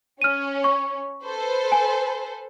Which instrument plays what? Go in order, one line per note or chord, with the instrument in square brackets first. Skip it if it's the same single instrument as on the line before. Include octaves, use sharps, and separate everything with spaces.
[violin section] C#4 [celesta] F6 D#7
[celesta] C#6
[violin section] A4 B4 C5
[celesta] G#5